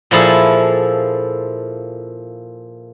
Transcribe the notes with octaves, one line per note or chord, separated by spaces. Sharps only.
A#2 F3 E4 G#4 A4